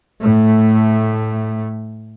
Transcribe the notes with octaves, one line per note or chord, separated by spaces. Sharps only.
A2 A3